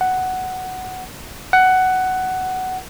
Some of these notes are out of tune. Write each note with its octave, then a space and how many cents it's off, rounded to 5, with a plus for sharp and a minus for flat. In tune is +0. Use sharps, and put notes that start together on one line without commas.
F#5 +5
F#5 +10